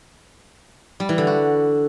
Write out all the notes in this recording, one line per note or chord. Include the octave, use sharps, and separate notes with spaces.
G3
E3
D3
F#4